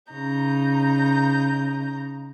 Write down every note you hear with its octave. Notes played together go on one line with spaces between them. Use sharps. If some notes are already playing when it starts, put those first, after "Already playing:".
C#3 D#4 A#5 G6